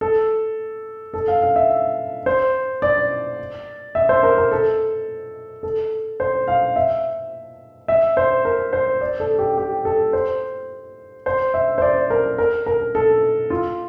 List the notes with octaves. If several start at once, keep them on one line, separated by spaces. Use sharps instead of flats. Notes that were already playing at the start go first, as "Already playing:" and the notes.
A4
A4
F5
F5
E5
C5
D5
E5
C5
A#4
A#4
A4
A4
C5
F5
E5
E5
C5
A#4
C5
D5
A4
G4
G4
A4
C5
C5
E5
C5
D5
A#4
A#4
A#4
A4
F4